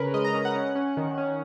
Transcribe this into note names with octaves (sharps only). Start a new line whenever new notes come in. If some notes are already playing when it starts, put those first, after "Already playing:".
Already playing: C#3 C#4 A#4 B4
G#3 D#5
A#5
C#4
F#5
C#4
C#4
D#3
C#4